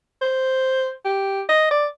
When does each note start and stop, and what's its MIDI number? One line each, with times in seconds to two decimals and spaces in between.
0.21 0.92 72
1.05 1.41 67
1.49 1.70 75
1.71 1.86 74